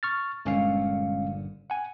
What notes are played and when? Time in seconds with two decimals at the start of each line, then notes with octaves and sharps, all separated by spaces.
0.03 C#6 F6 A6
0.45 G1 A#2 D3 G#3 C#4 F5
1.70 F#5 G#5